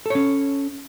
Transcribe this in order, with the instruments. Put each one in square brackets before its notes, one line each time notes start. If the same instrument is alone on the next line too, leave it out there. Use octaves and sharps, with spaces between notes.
[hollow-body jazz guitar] A4
C#5
C#4